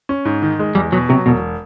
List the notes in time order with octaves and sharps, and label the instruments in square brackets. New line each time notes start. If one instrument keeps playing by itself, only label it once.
[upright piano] C#4
G#2
D#3
G#3
[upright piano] E2 [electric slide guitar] G3
[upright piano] B2 [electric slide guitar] F#3
[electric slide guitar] C3 [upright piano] F#3
[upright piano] E1 [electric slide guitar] B2